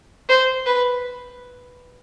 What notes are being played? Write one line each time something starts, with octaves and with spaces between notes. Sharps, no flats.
C5
B4